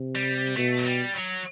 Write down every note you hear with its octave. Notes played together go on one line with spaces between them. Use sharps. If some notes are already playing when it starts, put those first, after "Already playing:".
Already playing: C3
G3
B2 A3
F#3
G3
F#3